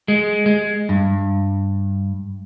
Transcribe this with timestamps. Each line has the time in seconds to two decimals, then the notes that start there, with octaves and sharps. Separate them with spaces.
0.08 G#3
0.46 G#3
0.89 G2